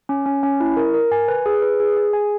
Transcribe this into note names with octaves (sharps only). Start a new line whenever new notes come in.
C#4
C#4
C#4
E4
A#4
A#4
G#5
B4
G#4
B4
G#4
G#4
G#5